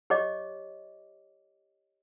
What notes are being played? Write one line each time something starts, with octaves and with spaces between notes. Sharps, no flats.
G4 C#5 D#5 D6